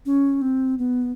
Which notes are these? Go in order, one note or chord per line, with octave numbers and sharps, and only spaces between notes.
C#4
C4
B3